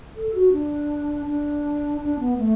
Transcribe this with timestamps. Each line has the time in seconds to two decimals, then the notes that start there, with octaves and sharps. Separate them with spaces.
0.16 A4
0.34 F#4
0.52 D4
1.26 D4
2.01 D4
2.20 B3
2.38 A3